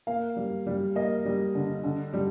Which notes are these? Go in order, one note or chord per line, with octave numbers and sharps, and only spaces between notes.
A#3 F5
G3
G3
A#3 D#5
G3
D3
D3
G3